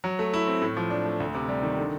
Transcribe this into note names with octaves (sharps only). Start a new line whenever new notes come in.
F#3
A3
E4
C4
A2
F3
D4
A3
D2
C3
G3
D#3
D3